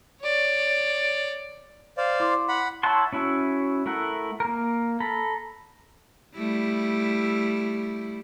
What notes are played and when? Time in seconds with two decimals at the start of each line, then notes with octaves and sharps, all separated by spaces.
0.21 C#5 D5
1.97 C5 D5 F5
2.20 E4 C6 D6
2.48 F#5 B5
2.83 E4 C#5 F#5 A5 C6
3.13 C#4 E4 F#4
3.86 A3 E4 A#4 F#5
4.40 A#3 A#4
5.00 A4 A#5 B5
6.35 G3 A3 E4